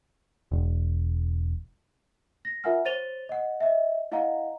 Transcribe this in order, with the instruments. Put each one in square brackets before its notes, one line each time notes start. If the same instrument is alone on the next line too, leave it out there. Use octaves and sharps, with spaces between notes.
[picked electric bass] E1
[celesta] A#6
F4 A#4 E5 F#5 G#5 F6
C5 C#5 A6 D#7 F7 G7
D#5 F#5
D#5 E5
E4 D#5 F5 F#5 A#5